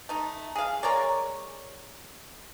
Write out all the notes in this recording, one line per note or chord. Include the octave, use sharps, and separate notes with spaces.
A3 D#4
G#4 F5
G#3 A#4 C#5 D5